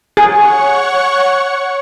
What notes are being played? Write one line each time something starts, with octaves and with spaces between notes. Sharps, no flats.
G#4 C#5 F#5 C#6